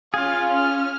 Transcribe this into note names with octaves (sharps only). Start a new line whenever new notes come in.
C#4 F4 G#4 F5
F6